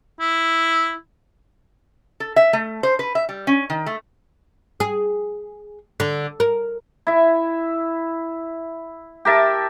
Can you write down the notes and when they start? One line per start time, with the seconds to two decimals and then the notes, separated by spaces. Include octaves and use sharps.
0.20 E4
2.20 A4
2.36 E5
2.53 A3
2.83 C5
2.99 B4
3.15 E5
3.29 G3
3.47 C#4
3.70 D#3
3.86 A3
4.80 G#4
6.00 D3
6.40 A#4
7.07 E4 E5
9.25 G4 A#4 E5 A5